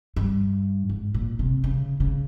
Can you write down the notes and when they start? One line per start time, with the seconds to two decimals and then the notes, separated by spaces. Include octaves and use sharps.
0.16 G2
0.90 G#2
1.15 A#2
1.39 C3
1.64 C#3
2.00 C#3